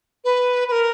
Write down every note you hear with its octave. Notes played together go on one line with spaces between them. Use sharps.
B4
B4
A#4